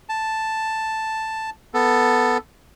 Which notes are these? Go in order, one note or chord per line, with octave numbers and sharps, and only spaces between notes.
A5
B3 A4